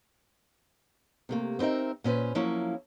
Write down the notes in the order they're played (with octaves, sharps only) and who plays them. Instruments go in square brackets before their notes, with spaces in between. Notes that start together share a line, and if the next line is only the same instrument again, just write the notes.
[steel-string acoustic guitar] C3 A3 A#3
B3 C4 D#4 A#4 E5
A#2 C#4 G4 B4 C5
F3 F#3 A#3 C#4 E4